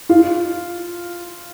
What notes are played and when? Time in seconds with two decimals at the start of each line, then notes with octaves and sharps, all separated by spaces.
0.09 F4